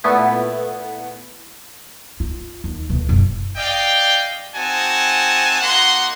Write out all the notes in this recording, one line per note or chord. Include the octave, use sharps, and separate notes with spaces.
A#2 A3 B3 E4
F4
D#2
D2 B2
F#1
D5 D#5 F5 G5
C4 D#4 F#4 G#5 A5
A#3 D#4 F#4 F#5 C6